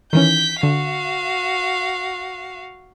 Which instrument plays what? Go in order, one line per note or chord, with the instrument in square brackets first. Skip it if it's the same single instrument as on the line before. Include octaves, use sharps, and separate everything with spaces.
[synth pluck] D#3 E3 C#4 [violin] G6 B6
[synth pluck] D3 [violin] F#4 F5